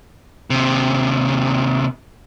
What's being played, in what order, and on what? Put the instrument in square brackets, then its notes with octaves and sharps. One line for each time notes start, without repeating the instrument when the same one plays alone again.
[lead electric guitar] D#2 C3